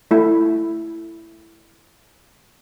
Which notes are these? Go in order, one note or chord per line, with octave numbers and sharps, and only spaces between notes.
A3 E4